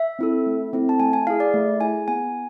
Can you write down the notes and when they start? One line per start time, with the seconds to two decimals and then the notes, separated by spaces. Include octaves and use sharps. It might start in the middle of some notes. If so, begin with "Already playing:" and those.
Already playing: E5
0.19 C4 E4 A4
0.46 A3
0.73 C4 E4 A4
0.89 A5
1.00 A3 G#5
1.13 G#5
1.27 E4 G#4 F5
1.40 D5
1.54 A3
1.81 E4 G#4 G#5
2.08 B3 G#5